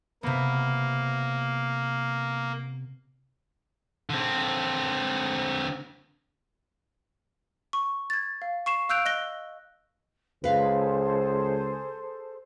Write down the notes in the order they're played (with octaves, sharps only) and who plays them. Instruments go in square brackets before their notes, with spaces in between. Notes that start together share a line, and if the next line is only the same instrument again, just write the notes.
[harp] C3 B3 [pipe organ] A#3
[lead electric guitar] D3 C4
[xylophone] C#6
G#6 A6
F5
C#6 C7 E7
F5 E6 F#6 G6 D7 F7
D#5 F#6 A#6 G7
[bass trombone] C#2 [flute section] G#4 A4 C5 [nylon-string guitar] B4 F5